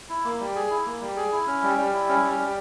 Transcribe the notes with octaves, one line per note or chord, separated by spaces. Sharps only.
E4
A#3
G3
G#4
E4
A#3
G3
G#4
E4
C#4
G3
G3
E4
C#4
G3
G3